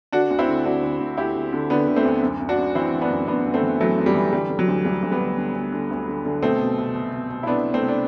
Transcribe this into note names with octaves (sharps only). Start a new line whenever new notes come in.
D3 D4 F#4
D2
C4 E4
D3
D2 D4 F#4
D2
D2
D2 E4 G4
D2
D3
D3 B3 D4
D3
A3 C4
D2
F#2
F#2
D4 F#4
F#2
E3 C4 E4
E3
B3 D4
F#2
F#2 B3 D4
F#2
A3 C4
E3
E3 F#3 A3
F#2
G3
E3
D3 G3
D3
F#3
D2
D2 G3
D2
G3 B3
D2
D3
D2
D3
D2
D3
D3
B2 A3 C4
B2
C2
B2
B2
B2
E4
C2 B3 D4
B2
A3 C4
C2
D4